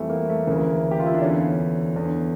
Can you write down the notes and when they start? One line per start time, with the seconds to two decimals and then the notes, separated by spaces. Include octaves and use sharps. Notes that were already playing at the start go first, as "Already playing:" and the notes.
Already playing: F2 E3 G3 A3
0.10 A#3
0.29 A3
0.47 D2 C#3 E3 A#3
0.91 G4
0.99 F4
1.06 E4
1.14 D4
1.22 E2 D3 C#4
1.96 E2 D3